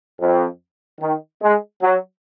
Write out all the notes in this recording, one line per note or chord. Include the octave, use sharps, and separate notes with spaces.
F2
D#3
G#3
F#3